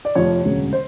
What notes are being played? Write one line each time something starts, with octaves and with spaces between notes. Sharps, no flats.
D5
F1 F2 C3 F3 C#5
E1 D2 C#3 F#3
C5